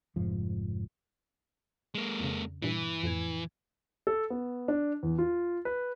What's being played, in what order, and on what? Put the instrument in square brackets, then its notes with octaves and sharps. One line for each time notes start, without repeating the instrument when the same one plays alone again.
[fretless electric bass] F1 G#2 F3
[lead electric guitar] G#3 A#3
[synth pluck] F2 C#3
[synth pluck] G2 A#2 [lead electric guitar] E3
[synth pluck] F2 A2 G#6
[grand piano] A4
B3
D4
E2
F4
B4